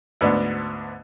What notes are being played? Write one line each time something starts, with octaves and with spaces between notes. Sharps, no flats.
D2 G#2 B3 D4